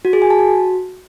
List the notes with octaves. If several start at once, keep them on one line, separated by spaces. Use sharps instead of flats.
F#4
G#4
G#5
A5
F#4